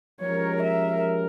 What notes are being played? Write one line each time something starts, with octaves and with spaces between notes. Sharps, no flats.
F3 G#3 C#4 G4 A#4 C#5
E5